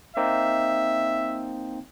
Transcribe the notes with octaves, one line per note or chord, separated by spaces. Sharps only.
A#3 C4 D#4 E5